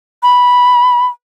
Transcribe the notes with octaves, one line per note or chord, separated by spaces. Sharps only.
B5